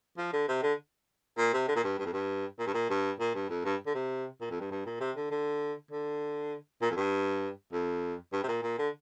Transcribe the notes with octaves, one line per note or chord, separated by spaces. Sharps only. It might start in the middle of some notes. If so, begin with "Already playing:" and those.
F3
D3
C3
D3
A#2
C3
D3
A#2
G2
G2
F2
G2
A#2
G2
A#2
G2
A#2
G2
F2
G2
D3
C3
A#2
F2
G2
G2
A#2
C3
D3
D3
D3
A#2
F2
G2
F2
G2
C3
A#2
A#2
D3